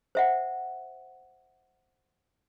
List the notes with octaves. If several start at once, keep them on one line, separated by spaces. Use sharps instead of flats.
C5 E5 F#5